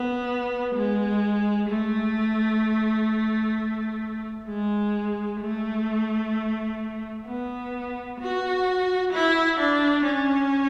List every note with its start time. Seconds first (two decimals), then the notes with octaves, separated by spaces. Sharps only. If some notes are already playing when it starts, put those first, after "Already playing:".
Already playing: B3
0.75 G#3
1.69 A3
4.48 G#3
5.41 A3
7.27 B3
8.20 F#4
9.13 E4
9.59 D4
10.05 C#4